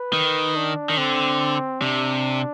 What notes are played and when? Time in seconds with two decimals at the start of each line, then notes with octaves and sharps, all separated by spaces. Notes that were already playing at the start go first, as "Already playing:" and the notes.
Already playing: B4
0.13 D#3
0.56 D4
0.90 D#3
0.97 D3 C4
1.81 C3 D4